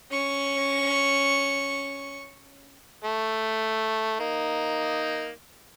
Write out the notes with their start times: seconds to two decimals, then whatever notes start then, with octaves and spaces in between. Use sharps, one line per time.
0.11 C#4 C#6
3.04 A3
4.20 A#3 D#4